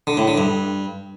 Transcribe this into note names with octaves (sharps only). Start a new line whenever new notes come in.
D3
A2
D3
G2